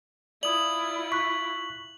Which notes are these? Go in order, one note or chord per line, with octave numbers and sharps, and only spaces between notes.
E4 F4 D5 D#6 F#7
C#6 F#6 B6